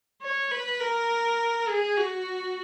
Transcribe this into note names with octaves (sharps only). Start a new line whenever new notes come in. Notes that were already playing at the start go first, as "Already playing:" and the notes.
C#5
B4
A#4
G#4
F#4